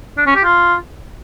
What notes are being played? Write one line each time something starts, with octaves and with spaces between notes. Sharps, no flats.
D4
C#4
G4
F4